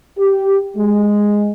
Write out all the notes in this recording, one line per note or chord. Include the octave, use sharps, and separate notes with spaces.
G4
G#3